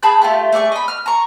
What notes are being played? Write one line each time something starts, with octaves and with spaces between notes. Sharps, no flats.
G#4 A5 B5 G6
A3 F4 G4
A3 G#4 D5 C#6
D#5 B5
F6
A#5 C#6